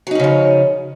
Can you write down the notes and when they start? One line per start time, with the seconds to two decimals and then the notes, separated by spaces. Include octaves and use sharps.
0.07 F#3
0.11 D#4
0.15 C#4
0.20 C#3
0.24 F3